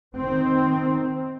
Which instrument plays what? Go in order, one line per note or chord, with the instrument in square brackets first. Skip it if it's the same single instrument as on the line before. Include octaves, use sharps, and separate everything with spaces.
[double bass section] D#3 C4